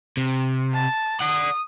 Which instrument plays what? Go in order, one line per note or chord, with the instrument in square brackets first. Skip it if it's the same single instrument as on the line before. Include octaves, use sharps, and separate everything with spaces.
[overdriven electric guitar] C3
[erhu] A5
[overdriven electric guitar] D5 F#5 [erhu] D#6